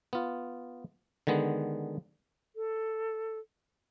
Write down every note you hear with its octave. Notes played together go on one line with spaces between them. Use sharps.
B3 F4
D3 D#3 G#3 B3
A4